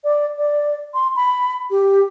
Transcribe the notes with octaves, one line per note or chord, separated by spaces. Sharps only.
D5
D5
C6
B5
G4